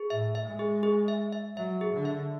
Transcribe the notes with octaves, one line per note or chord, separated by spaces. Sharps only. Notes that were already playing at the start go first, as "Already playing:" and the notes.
Already playing: G#4
A2 E5
E5
G#3
G#4
G#4
E5
E5
F#3 E5
G#4
D3
E5